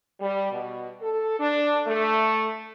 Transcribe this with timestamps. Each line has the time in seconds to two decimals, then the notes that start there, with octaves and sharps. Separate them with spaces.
0.20 G3
0.51 B2
1.02 A4
1.39 D4
1.85 A3